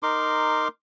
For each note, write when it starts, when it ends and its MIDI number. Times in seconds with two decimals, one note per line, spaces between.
0.03 0.68 63
0.03 0.68 70
0.03 0.68 84
0.03 0.68 86